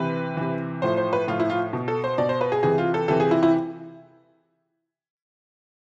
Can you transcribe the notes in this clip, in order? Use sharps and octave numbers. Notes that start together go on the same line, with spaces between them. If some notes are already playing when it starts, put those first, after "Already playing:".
Already playing: C3 E3 B4
C3 E3
A2 F3 C5
C5
B4
A2 F3 F4
E4
F4
B2
A4
C5
B2 D5
C5
B4
G#4
C3 E3 G#4
F4
A4
C3 E3 A4
G#4
E4
E4